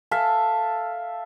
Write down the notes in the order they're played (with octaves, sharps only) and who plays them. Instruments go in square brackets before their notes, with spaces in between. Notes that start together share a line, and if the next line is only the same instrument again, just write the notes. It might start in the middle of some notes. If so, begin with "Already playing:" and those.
[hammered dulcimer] A4 E5 F5